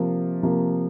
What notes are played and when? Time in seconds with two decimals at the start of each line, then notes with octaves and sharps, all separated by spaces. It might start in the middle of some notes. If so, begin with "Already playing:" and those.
Already playing: C3 F3 A#3
0.43 C3 F3 A#3